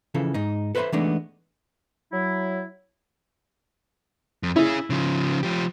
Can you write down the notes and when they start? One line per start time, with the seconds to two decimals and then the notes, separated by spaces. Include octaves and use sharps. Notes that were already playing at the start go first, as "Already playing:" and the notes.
0.14 C#3 E3 F3 A4
0.34 G#2 D#4
0.75 A4 B4 C5 D5 E5 B5
0.92 E3 G#3 A3 B3 D4 D#4
2.12 F#3 E4
4.43 F2
4.56 C#4 E4 G#4
4.90 C#3 F3
5.43 F3 G4